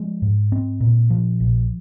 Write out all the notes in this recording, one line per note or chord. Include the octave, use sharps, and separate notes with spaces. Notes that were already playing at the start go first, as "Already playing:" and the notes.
Already playing: F3 G#3
G#2
C4
A#2
F3
A#1